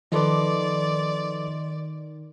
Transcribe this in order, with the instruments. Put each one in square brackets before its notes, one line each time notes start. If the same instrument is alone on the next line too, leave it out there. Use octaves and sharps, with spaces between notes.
[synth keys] D#3 [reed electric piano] F3 A4 B4 [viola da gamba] D5 [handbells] D#5 C6 D6